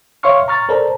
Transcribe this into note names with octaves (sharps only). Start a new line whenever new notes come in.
C#5 E5 F5 C6 C#6 F6
A#5 C#6 F6 A6
A4 A#4 C5 D5 A5 A#5